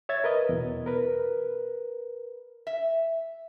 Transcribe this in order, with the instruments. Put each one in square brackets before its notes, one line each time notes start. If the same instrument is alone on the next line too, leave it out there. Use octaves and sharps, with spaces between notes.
[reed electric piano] C#5 E5 G#6 A6
A#4 B4 D#5
E2 B2
A#4 B4
[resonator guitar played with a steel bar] E5